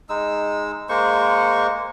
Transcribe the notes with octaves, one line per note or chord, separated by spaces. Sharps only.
G#3 D#4 E6
G#3 A#3 C5 C#6